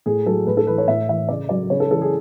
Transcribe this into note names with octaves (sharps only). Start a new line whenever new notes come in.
A2 G#4
F#3 A4
A2 B4
A4
E3 B4
C#5
A2 E5
E3 E5
C#3 D5
F#3 D5
C#3 C#5
A4
E3 A4
G#4